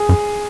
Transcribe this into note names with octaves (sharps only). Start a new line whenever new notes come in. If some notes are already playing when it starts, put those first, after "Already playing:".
Already playing: G#4
F#2